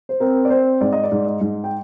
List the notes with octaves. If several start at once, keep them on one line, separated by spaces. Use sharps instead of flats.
C5
C4 A#4
D5
C4 C5
G#2 D5
D#5
D5
G#2
D#5
G#2
G5